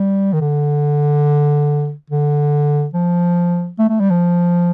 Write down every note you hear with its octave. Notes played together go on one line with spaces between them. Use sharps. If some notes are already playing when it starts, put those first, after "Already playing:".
Already playing: G3
D#3
D3
D3
F3
A3
A3
G3
F3